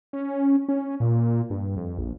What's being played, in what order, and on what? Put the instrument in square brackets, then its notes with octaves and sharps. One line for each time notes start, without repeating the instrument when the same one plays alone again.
[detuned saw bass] C#4
C#4
A#2
G2
F2
A#1